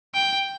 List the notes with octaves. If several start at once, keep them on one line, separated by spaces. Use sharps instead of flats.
G5